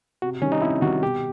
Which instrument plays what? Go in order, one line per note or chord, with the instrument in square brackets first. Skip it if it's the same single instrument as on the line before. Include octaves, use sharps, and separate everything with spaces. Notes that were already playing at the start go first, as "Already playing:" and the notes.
[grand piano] C3 [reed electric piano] F#4
[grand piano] D#3 G3 [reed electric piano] C#4
[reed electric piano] D#4
[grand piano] C3 [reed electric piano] E4
[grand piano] D#3 G3 [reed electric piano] F#4
[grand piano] B2 [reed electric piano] G4